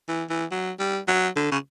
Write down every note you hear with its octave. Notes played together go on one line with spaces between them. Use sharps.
E3
E3
F#3
G3
F#3
D3
C#3